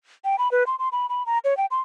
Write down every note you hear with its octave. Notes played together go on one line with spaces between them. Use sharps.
G5
B5
B4
C6
C6
B5
B5
A#5
C#5
G5
C6